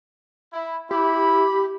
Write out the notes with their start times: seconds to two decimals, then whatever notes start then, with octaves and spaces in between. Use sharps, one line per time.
0.53 E4
0.91 E4 G4 B5